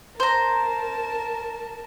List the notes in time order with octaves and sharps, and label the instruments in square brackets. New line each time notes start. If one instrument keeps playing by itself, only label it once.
[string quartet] A#4 A5 [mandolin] C5 A#5